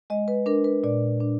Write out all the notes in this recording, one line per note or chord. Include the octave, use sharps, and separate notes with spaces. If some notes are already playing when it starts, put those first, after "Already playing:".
G#3 D#5
B4
D4 A#4
B4
A#2 D5
D4